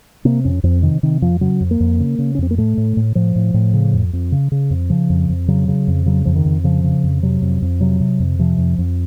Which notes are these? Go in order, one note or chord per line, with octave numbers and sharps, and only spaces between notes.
C3 A#3
F2 C#4
F2 C4
C3 D#3
C3 D#3
F2 F3
C#3 F#3
F2
A#3
F2
C#3
C#3
C#4
F2 C4
A#3
A2 A3
A2
A2
A2 F3
A2
A2
C#3
F2
F2
C#3
C#3
F2
C#3 F3
F2
F2
C#3 F#3
C#3
F2
C#3 F#3
F2 F3
D#3
F2
C#3 F3
C#3
F2
C3 F#3
F2
F2
C3 F#3
C3
F2
C3 F3
F2
F2